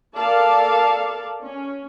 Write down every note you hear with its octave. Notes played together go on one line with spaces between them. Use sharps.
A4 A#4 D5 F5 A5
C#4